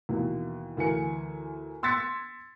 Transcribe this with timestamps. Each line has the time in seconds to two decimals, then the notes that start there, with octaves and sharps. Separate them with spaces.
0.09 D#2 B2 E3
0.77 D2 E3 A#4 G#5 C#7
1.83 C6 E6 G#6 A6 B6 C#7